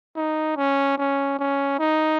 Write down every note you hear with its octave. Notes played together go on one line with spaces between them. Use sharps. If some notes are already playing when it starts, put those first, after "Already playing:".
D#4
C#4
C#4
C#4
D#4